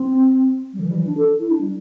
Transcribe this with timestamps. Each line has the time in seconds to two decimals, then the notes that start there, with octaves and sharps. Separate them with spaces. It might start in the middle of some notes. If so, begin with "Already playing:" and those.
Already playing: C4
0.74 G3
0.80 D3
0.84 E3
0.91 G3
0.95 E3
1.07 D4
1.17 A4
1.40 E4
1.51 D4
1.61 G3